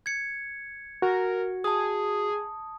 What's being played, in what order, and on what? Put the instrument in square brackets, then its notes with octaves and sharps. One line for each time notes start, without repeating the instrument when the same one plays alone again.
[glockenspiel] G#6 C#7
[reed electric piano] F#4 [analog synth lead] A#4
[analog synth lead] G#4 [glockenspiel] A5 D#6